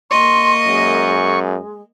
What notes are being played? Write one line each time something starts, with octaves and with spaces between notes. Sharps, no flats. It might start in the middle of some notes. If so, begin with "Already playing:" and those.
A#3 D#5 C6 C#6
F#2 G#3